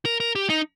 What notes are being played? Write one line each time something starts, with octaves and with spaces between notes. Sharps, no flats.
A#4
A#4
G4
D#4